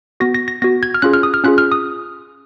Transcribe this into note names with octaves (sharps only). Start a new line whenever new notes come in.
B3 F#4 A#6
A#6
A#6
B3 F#4 A#6
G#6
F6
C#4 F4 G#4 F#6
F6
D#6
F6
C#4 F4 G#4 F#6
F6
D#6